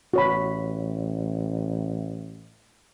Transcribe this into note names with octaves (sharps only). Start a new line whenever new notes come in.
A1 F#4 C#5 B5